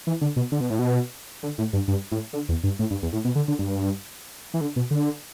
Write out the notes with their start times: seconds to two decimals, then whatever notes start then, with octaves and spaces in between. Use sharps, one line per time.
0.07 E3
0.21 D3
0.36 B2
0.52 D3
0.61 B2
0.70 A2
0.79 B2
1.43 D3
1.58 A2
1.73 G2
1.88 G2
2.12 A2
2.33 D3
2.49 E2
2.63 G2
2.79 A2
2.91 G2
3.03 E2
3.13 A2
3.25 B2
3.35 D3
3.48 D3
3.59 G2
4.54 E3
4.61 D3
4.76 B2
4.91 D3